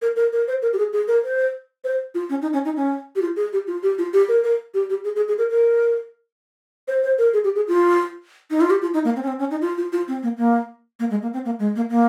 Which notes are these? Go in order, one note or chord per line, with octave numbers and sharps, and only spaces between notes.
A#4
A#4
A#4
C5
A#4
G4
G#4
G#4
A#4
C5
C5
F4
C#4
D#4
C#4
D#4
C#4
G4
F4
G#4
G4
F4
G4
F4
G4
A#4
A#4
G4
G4
G#4
G#4
G#4
A#4
A#4
C5
C5
A#4
G#4
G4
G#4
F4
D#4
F4
G4
F4
D#4
A#3
C4
C#4
C4
C#4
D#4
F4
F4
F4
C4
A#3
A#3
A#3
G#3
A#3
C4
A#3
G#3
A#3
A#3